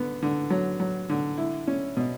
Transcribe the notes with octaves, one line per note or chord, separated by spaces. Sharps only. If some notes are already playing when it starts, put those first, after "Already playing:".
Already playing: D3 B3
D3
F#3
F#3
D3
E4
C#4
B2